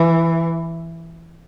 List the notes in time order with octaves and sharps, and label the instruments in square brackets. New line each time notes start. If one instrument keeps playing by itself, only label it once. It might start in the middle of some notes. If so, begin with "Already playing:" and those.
Already playing: [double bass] E3